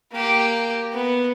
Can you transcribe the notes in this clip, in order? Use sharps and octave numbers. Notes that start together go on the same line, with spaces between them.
A#3 G4
B3